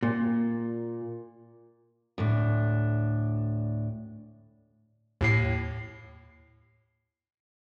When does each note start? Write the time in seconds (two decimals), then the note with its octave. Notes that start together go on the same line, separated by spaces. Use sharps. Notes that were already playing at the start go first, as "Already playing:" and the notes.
0.03 A#2
2.18 D2 A2 D4
5.21 D#2 A2 C7